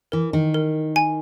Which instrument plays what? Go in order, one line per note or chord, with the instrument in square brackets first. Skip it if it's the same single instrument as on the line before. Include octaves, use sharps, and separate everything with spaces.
[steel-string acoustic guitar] E3 [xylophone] A#4
[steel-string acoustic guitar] D#3
[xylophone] A#4
G#5